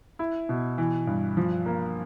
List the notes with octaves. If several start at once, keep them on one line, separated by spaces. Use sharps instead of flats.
E4
B2
E3
G2
F3
A#3